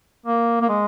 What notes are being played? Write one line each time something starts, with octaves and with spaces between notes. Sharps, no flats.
A#3
A#3
G#3